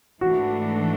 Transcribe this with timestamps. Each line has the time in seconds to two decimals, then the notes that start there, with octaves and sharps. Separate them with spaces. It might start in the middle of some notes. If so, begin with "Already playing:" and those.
0.21 G#2 E3 A3 D4 F#4